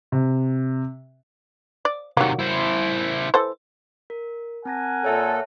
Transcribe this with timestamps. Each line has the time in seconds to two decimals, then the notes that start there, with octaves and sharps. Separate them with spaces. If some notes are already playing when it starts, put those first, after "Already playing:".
0.12 C3
1.85 D5
2.17 C3 D#3 F#3 A#3
2.39 E4 C5
3.34 E3 A4 C5
4.10 A#4
4.65 C4 A#4 F#5 G#5 A5 A#6
5.04 A#2 A4 C#5 E5 A5